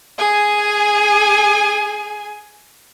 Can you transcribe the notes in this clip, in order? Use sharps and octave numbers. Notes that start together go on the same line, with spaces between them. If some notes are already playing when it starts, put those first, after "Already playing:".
G#4 G#5